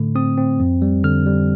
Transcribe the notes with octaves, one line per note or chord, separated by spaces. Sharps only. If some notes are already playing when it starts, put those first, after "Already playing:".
Already playing: A2 D3 A3
C4 D#6
C4
F2
G3
D3 F6
G3